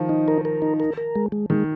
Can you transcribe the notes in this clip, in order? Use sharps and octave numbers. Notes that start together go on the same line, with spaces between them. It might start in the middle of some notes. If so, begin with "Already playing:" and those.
Already playing: D#3 F3
D#4
A#4
A#4
D#4
A#4
A#4
G#3
G#3
D#3 G#3